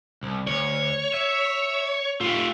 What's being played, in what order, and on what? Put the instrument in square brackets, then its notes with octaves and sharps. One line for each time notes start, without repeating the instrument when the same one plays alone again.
[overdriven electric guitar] C2
[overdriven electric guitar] D2 [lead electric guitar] C#5
[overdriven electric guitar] E5
[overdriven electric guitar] A3 [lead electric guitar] F4 G4